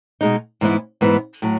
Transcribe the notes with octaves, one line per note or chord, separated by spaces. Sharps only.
B2 G#3 D#4
G#2 E3 B3 E4
G#2 E3 B3 E4
A2 F#3